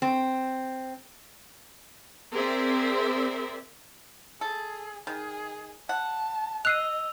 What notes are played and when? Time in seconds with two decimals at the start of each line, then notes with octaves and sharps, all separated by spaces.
0.02 C4
2.32 C4 G#4 A#4 C5 D5 E5
4.41 G#4 A4
5.07 D#3 G#4
5.89 F#5 A5
6.65 D#5 E6 F#6 C7 D#7 F7